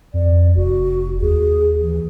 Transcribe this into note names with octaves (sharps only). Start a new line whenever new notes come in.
F2 D5
F1 F#4
D#2 G#4
E3